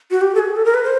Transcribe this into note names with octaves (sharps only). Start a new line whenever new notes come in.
F#4
G4
A4
G#4
A4
A#4
B4
C5